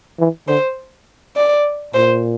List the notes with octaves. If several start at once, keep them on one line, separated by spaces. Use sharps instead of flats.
E3
D3 C5
D5
A#2 C5